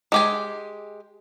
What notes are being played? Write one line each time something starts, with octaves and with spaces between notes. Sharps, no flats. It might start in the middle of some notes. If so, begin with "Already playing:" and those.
G#3 G4 G#5